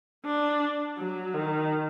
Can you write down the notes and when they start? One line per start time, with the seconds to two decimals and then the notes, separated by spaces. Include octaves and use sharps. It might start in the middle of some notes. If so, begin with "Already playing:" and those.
0.25 D4
0.98 F#3
1.34 D#3